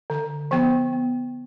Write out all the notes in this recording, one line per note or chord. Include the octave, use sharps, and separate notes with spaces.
D3
F3 B3
B3